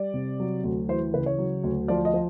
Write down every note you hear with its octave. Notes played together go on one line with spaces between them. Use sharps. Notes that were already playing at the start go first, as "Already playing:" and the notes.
Already playing: G3 D5
C3
F#3
D2
E3 C5
C#3 B4
C#5
F#3
D2
F3 D5
D#5
F3